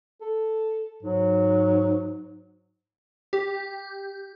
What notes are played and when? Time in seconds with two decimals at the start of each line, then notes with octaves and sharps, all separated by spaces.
0.21 A4
1.03 G#2 F#3
3.33 G4